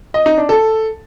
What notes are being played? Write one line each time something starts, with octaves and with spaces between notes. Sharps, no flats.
D#5
D#4
D4
A4